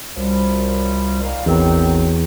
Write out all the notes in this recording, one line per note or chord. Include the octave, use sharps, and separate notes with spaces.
C2 F#2 F3 G3
A#2 D#3 F5
A1 E2 D#3 F#3 C4